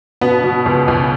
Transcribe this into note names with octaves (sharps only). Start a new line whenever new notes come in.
B2 B3
B2
C#2
C#2